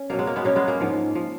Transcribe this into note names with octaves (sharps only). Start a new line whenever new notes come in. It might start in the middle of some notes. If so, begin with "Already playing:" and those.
Already playing: C#4
B2 F#3 A#3
G#3
A#3
G#3 B3
B2 F#3 A#3 C#4
G#3 B3
A#3
G#2 F3
F3